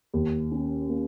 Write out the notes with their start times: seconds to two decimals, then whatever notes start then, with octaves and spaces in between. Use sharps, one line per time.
0.14 D#2
0.52 C#4
0.89 A#3